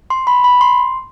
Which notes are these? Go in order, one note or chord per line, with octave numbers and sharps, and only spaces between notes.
C6
B5
B5
C6